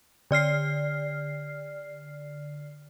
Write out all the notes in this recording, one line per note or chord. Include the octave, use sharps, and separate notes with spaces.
D3 D5 F6 C7